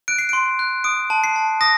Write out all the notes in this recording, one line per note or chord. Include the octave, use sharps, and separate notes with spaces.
F#6 D7
C7
C6 D7
F#6
D#6 D7
A5
C7
A5
D#6 A#6